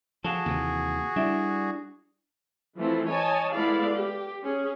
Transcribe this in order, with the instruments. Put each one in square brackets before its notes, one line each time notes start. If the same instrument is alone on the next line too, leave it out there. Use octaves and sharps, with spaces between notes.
[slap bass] F3 [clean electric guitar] F4 A4 [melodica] F#4 G#4
[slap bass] D#2 C3 E3
[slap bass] G3 [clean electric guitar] D4 E4 E5
[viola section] E3 F3 A3 C4 E4
C#5 D#5 G#5 A5
G#3 A3 B3 E4 D5 F5
G4
C#4 G#4